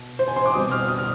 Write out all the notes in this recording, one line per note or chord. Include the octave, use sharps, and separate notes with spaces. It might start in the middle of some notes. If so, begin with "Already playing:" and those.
Already playing: B2
C5
G#5
C6
D6
B2 G3 C4 D#6
F6
D#6
F6